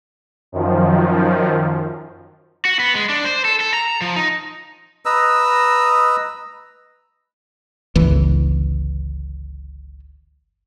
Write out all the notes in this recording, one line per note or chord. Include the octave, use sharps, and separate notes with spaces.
F#2 D#3 F3
F#4
B3
G#3
D4
C5
A4
A4
A#5
F3
D#4
B4 D#5 A#5 E6
G1 C#2 E3